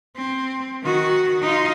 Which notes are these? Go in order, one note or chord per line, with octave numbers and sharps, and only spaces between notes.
C4
D#3 F#4
D#4 F4